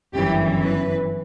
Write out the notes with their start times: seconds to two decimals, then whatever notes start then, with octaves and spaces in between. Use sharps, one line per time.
0.14 G1 F#2 E3 G4
0.63 B4